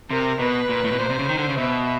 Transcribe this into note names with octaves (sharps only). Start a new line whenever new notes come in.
C3 A#4
B2 B4
A#2
A2
B2
A#2 C5
C3
C#3
D#3
D3
C#3
B2 E5